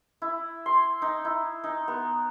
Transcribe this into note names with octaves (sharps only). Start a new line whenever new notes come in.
E4
C6
D#4
E4
D#4
B3